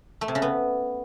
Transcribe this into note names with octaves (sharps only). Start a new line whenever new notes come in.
A3
C3
C#3
B3